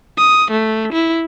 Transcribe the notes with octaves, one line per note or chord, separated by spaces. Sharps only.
D#6
A3
E4